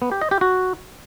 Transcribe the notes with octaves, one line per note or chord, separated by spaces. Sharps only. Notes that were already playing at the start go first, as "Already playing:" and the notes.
B3
G4
D#5
G4
F#4